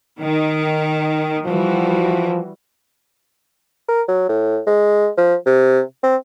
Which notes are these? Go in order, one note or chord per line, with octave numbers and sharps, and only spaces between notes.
D#3
E3 F3 G3 F#4
A#4
F#3
A2
G#3
F3
C3
C4